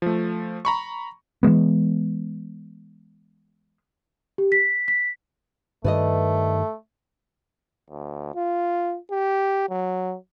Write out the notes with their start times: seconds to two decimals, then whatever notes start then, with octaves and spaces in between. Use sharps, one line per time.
0.02 F3 A3
0.65 A#5 B5 C#6
1.43 E3 F#3 G#3 B3
4.38 G4
4.52 B6
4.88 B6
5.84 G2 D#3 A3 B4 D5 D#5
7.90 D2
8.35 F4
9.11 G4
9.69 F#3